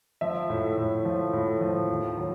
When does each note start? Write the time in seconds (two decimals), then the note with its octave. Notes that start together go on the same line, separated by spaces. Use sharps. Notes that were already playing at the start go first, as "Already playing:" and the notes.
0.21 F3 E5
0.50 A2
0.78 A2
1.05 F3
1.33 A2
1.61 F3
1.89 D#2
2.17 F#3